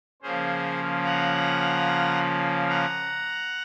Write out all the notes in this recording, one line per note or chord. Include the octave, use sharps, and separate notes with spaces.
C#3 F3 A#3 C#4 G#4 C5
F#5 A#5
F#5 A#5